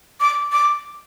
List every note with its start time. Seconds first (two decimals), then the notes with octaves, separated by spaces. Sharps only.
0.20 D6
0.52 D6